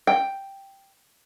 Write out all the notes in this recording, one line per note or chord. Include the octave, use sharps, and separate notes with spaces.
G5